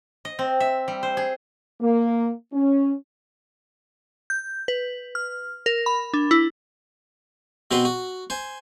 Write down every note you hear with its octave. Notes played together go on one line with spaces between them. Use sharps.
D#5
C4
E5
G3
C5
G#4
A#3
C#4
G6
B4
F6
A#4
B5
D4
E4
B2 C4 F#4 B4 C6
F#4
C5 G#5